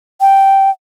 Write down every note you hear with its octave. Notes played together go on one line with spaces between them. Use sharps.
G5